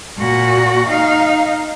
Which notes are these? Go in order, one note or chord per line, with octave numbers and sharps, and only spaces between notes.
A#2 F#4
D#4 F5